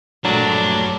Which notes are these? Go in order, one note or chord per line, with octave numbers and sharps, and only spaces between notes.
A#1 G2 F#3 A3 D4 A#4